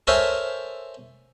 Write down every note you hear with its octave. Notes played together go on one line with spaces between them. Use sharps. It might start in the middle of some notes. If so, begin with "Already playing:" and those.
A4 A#4 C5 C#5 E5 G#5